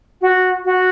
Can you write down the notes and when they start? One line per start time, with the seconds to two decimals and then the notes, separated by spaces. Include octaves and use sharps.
0.21 F#4
0.65 F#4